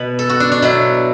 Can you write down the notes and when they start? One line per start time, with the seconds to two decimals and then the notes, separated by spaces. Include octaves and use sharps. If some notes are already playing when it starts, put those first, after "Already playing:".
Already playing: B2 B4
0.19 A4
0.29 F#4
0.40 D4
0.52 D4
0.62 B2 F#3 E4